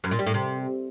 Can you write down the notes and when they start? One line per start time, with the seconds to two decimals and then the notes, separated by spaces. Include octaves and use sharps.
0.04 F#2
0.11 A#2
0.19 G3
0.26 A2
0.34 C3